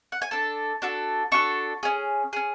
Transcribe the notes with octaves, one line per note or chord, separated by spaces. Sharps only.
F#5
G#5
D4 A4 A5
D4 F#4 A4
D4 F#4 A4 C#6
C#4 G#4
C#4 G#4